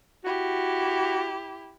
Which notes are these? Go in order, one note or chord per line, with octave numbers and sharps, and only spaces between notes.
E4 F#4 G4